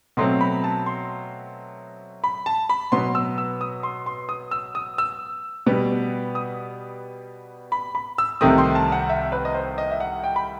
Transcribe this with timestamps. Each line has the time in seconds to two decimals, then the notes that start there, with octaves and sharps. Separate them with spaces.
0.17 B2 F#3 A3 C4 C6
0.41 B5
0.64 A5
0.86 C6
2.24 B5
2.46 A5
2.69 B5
2.92 B2 F#3 B3 C6
3.15 E6
3.38 E6
3.61 D#6
3.83 C6
4.06 C6
4.29 D#6
4.51 E6
4.75 D#6
4.98 E6
5.66 B2 G3 B3
6.35 D#6
7.72 B5
7.95 B5
8.18 E6
8.41 C2 C3 D#3 A3 C4 D#6
8.58 C6
8.75 A5
8.92 F#5
9.10 E5
9.32 B4
9.45 D#5
9.54 C5
9.78 D#5
9.91 E5
10.00 F#5
10.24 G5
10.36 B5